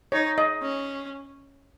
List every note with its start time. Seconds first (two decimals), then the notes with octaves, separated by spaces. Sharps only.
0.12 D#4 C#5
0.38 D#5
0.62 C#4